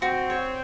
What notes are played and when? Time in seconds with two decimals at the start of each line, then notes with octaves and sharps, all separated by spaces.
0.02 C4 F#4
0.30 C#5